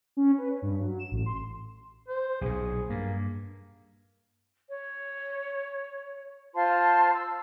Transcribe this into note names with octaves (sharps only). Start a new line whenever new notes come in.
C#4
B4
C#5
G2
F#3
E7
A1
C6
C5
B1 A#2 G#4
G2 A#3
C#5
F4 C5 A5 C6
E6